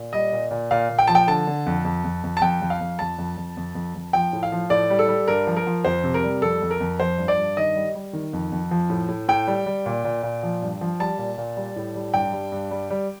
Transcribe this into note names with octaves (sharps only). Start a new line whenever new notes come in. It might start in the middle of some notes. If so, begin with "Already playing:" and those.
Already playing: A#2
G3 D#5
A#2
A#2
A#2 F5
A#2
G5
F3 A5
G5
D3 A5
D3
F2
F2
F2
F2
A5
F2 G5
F2
F5
F2
F2 A5
F2
F2
F2
F2
F2
F3 G5
A2
F5
F3
A2 D5
G3
A4
G3
G2 A#4
F3
A#4
F3
F2 C5
C3
A#4
G3
F2 A4
F2
A#4
F2
F3 C5
G2
D5
G2
D#3 D#5
G3
G3
D#3
F2
F2
F3
A2
A2
A2 G5
G3
G3
A#2
A#2
A#2
F3
G2
F3
G3 A5
A#2
A#2
G3
A2
G3
G2 G5
G3
G2
G3
G3